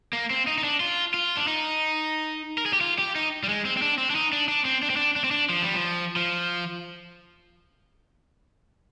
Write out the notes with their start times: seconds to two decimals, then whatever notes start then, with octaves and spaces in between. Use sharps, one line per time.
0.13 A#3
0.30 C4
0.47 D#4
0.58 D#4
0.64 D4
0.80 F4
1.14 F4
1.37 D4
1.47 D#4
2.58 A#4
2.66 G#4
2.73 G4
2.81 F4
2.98 G4
3.16 D#4
3.43 G3
3.49 G#3
3.65 C4
3.77 C4
3.82 D4
3.98 C4
4.10 D4
4.15 D#4
4.33 D4
4.48 D4
4.65 C4
4.83 D4
4.90 C4
4.97 D4
5.16 D4
5.24 C4
5.31 D4
5.50 F3
5.62 G3
5.75 F3
6.16 F3